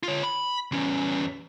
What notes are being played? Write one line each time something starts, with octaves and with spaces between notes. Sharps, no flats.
F4 C#5
B5
E2 C#4